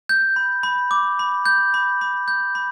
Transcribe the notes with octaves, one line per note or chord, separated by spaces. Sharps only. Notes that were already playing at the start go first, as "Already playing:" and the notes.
G6
B5
B5
D6
B5
G6
B5
B5
G6
B5